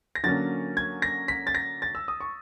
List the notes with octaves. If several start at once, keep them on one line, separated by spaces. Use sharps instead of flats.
A#6
D3 F#3 A#3 C#4 A6
G#6
A#6
B6
A6
A#6
A6
E6
D#6
C#6